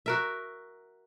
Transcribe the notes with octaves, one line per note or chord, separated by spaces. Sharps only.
F#4 A#4 E5